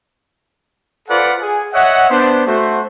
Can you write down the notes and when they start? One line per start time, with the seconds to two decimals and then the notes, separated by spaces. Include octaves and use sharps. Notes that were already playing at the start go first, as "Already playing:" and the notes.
1.08 F4 A4 B4 C5 D5 F#5
1.41 G#4 G#5
1.73 C#5 D#5 E5 F#5
2.10 B3 D4 C5
2.46 A3 F#4 C5